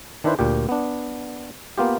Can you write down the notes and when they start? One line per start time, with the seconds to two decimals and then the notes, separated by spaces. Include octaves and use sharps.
0.24 D#3 D4 E4 B4 C5
0.39 D2 A#2 G4
0.69 B3 D4
1.78 A#3 B3 F4 G4